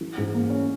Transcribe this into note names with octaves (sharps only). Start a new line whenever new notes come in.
E3
G#2
A#3
C#4